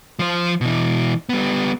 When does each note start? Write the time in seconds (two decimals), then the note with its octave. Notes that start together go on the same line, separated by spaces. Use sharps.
0.19 F3 C5
0.61 B2 E3
1.29 G3 B3